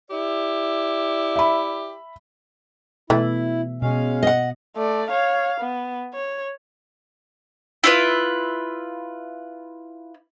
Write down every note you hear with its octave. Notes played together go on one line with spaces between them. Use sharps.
E4 G4 D5
E5 B5
B2 E3 A3 E4 E5
B2 G#3 C#4 F5
D#5 F#5
A3 D5
C#5 F5
B3
C#5
E4 F4 B4